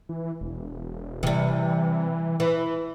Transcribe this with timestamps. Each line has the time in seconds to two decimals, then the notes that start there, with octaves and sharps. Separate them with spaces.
0.09 E3
0.41 E1
1.23 C3 E3 G3
2.40 E3